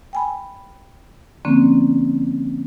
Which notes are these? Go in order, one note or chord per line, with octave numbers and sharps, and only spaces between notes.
G5 G#5 B5
D3 F3 A#3 C4 C#4